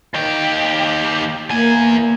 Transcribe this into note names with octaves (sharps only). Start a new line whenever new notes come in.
D#2 G4
E2 A#3 G#5